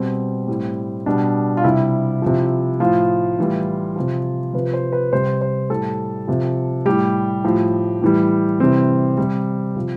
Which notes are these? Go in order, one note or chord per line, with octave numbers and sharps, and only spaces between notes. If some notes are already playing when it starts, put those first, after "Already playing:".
Already playing: B2 G3 C4
A2 G3
B2 G3 D4
F4
C3 G3 E4
C3 F3
A2 F3 F4
A2 E3 G3
C3 F3
C3 F3 B4
C5
B4
C3 G3 C5
C5
A2 G3 A4
C3 F3
A2 G3 G4
A2 F3
A2 E3 G3
C3 E3 G3 C4
C3 G3
C3 F3